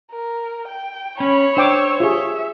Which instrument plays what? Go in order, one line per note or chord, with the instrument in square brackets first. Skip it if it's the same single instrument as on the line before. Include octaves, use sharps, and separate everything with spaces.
[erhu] A#4
G5
[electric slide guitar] C#4 [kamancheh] C#5 [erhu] B5
[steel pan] D4 G5 D6 [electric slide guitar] C5 [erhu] E6
[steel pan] F4 G4 G#4 [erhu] E5